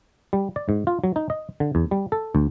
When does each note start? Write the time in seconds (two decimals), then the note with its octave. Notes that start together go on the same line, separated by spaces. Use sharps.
0.33 G3
0.56 D5
0.69 G#2
0.87 F4
1.04 F#3
1.16 D#4
1.30 D#5
1.60 D3
1.75 E2
1.91 G3
2.12 A4
2.35 D2